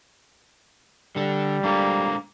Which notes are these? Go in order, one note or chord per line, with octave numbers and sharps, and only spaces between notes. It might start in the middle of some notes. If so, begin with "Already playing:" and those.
D3 G3 A4
G#3 A#3 D4 A4